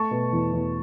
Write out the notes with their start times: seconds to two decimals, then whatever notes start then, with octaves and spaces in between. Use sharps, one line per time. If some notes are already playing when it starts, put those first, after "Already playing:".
Already playing: A3 A5 C#6
0.11 B2
0.32 E2
0.53 E2